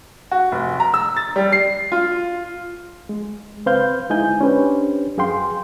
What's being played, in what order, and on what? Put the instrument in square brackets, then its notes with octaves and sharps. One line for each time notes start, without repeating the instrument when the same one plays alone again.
[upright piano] F#4
F1
A#5
E6
A6
G3
C7
F4
[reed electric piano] G#3
C#2 C4 B4 C5 F5 G6
D2 G#3 D#4 E4 G#5 G6
C#4 D4 G4 B4 C5
F#2 G#4 F5 G5 C6